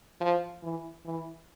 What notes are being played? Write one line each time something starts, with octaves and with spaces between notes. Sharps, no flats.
F3
E3
E3